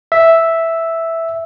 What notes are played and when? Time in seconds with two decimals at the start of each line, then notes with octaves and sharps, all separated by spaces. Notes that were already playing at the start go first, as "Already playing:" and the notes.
0.12 E5